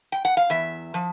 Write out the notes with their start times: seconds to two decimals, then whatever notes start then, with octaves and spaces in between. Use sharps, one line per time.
0.12 G5
0.25 F#5
0.37 F5
0.50 E2 E5
0.94 F3